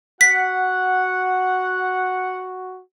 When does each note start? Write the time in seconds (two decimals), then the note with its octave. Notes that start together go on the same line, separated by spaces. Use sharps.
0.21 F#4 F#5 B6